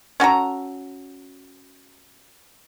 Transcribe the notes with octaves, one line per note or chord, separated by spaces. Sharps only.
C#4 F#4 A4 A#5